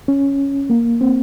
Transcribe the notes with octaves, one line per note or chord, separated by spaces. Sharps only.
C#4
A#3
C4